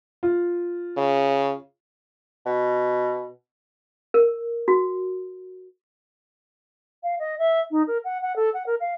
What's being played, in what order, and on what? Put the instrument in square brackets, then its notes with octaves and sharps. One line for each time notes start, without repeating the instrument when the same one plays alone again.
[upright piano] F4
[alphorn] C#3
[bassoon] B2
[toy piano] A#4
F#4
[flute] F5
D#5
E5
D#4
A#4
F#5
F#5
A4
F#5
A#4
F5